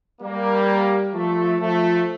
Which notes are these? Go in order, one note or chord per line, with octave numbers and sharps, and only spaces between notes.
G3 A#3
F3 A3
F3 A3